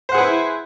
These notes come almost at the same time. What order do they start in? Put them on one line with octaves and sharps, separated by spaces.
C5 F#5 G#4 B4 E4